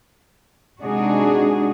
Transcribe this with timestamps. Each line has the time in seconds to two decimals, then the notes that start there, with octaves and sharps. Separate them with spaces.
0.82 C3 G#3 D4 D#4 F#4 G#4